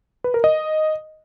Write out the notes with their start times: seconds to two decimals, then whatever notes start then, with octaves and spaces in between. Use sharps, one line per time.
0.24 B4
0.34 A#4
0.44 D#5